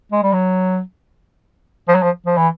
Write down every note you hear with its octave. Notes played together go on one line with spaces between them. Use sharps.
G#3
G3
F#3
F3
F#3
F3
F3
E3